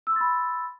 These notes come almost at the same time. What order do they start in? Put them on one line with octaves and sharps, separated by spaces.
E6 C6 A6 B5